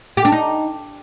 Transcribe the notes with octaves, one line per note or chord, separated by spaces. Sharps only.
G4
D4
D#4